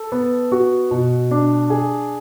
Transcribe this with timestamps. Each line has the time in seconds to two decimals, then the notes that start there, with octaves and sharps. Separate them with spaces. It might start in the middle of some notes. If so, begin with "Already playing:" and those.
Already playing: A4
0.12 B3
0.52 F#4
0.91 B2
1.31 D4
1.70 G#4